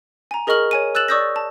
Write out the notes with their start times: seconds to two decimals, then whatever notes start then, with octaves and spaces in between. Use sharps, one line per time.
0.31 G#5 A#5
0.47 G#4 A#4 D#5 C#6 F6 F#7
0.71 C#5 G#5 D#7
0.95 E6 F#6 A6 E7 F#7
1.08 D5 C#6 D#6 E6 G6 A#6
1.36 A5